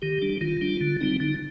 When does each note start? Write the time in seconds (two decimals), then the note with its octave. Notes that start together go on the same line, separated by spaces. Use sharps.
0.02 D#3 G4
0.22 G3 D4
0.41 D#3 F4
0.61 G3 D4
0.81 D3
1.01 G3 C4 D#4
1.20 D3 D#4